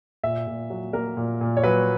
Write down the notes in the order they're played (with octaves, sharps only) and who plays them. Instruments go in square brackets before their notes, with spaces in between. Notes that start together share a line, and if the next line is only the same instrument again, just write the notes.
[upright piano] A#2 E5
A#2
F#3
A#3 A#4
A#2
A#2
C#5
F#3 B4